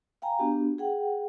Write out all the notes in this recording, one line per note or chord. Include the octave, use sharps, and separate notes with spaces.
F5 G5 G#5 A#5
B3 D4 F#4 G4
G#4 F#5 G5